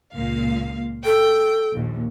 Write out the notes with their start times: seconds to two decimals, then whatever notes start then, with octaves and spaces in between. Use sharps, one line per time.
0.15 C#2 A#2 F5
1.05 A4 G5
1.74 A#1 D#2